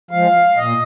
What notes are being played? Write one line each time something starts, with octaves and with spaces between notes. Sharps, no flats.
F3 G#3 F5
A#2 D#5